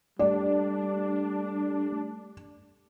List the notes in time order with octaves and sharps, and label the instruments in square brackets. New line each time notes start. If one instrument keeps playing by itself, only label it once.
[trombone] G3 [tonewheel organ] A3 [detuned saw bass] D4 [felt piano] D5